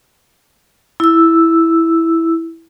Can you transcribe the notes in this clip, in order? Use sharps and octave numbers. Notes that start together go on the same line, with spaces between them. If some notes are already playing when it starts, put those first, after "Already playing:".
E4 E6